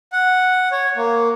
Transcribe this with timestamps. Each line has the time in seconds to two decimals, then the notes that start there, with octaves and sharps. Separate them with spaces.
0.12 F#5
0.71 C#5
0.96 A#3